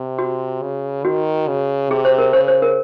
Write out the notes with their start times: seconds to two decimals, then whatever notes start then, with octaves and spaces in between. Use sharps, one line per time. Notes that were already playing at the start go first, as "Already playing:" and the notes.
Already playing: C3
0.19 F#4
0.62 C#3
1.05 D#3 F#4
1.48 C#3
1.90 C3 G#4
2.05 C5
2.18 A#4
2.33 C#3 C5
2.48 C5
2.62 A#4